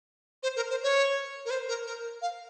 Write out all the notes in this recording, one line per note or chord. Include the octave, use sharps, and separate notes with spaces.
C5
A#4
C5
C#5
A#4
C5
A#4
A#4
F5